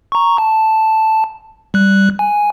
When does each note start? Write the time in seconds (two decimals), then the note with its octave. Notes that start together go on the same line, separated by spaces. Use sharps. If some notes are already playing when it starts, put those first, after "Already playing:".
0.12 A#5 C#6
0.38 A5
1.74 G3 F#6
2.19 G#5